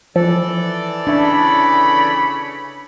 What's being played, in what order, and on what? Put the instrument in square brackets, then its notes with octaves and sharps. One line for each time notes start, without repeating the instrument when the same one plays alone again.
[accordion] E3 A4 D5 [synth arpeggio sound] F3
[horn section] C#3 C#5 B5 [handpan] D4 E5